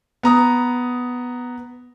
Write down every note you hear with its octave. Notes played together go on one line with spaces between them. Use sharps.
B3 A#5 D#6